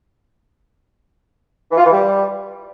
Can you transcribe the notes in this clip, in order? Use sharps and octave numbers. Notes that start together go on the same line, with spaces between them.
E3
F4
E3
G3